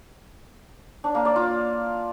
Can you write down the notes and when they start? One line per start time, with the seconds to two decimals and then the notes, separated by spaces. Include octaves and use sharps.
1.04 D4
1.15 A#3
1.25 D5
1.36 F4